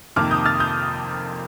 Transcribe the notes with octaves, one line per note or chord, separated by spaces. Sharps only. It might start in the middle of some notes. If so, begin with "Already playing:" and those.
F2 C3 D#3 A#3 D6 F6
D#6 G6
F6 A6
D#6 G6